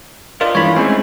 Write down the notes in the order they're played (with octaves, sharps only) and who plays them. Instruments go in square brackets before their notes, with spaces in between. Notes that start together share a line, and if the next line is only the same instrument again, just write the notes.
[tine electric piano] F4 [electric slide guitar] A#4 D5 D#5
[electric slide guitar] G2 E3 G#3 [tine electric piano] C#5 B5
[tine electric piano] G#3 C#4 [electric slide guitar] A3 C4